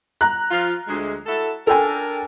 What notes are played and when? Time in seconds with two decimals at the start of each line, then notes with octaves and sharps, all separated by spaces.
0.21 A#5 F#6
0.50 F3 F4
0.87 D2 G#3
1.26 E4 F#4 A4
1.67 D4 A4 A#4 G5 G#5